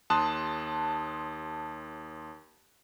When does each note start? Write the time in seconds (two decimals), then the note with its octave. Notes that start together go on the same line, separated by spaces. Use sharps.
0.10 D#2 A5 C6 D#6 F#6